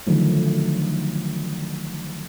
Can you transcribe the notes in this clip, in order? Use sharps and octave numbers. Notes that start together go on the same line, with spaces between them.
D3 D#3 F3 F#3 A3